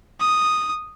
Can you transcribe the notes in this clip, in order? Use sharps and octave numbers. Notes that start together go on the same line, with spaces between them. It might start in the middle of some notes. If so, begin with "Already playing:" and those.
D#6